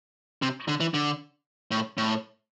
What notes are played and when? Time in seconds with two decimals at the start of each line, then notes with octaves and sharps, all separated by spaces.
0.42 C3
0.68 D3
0.80 E3
0.94 D3
1.71 A2
1.98 A2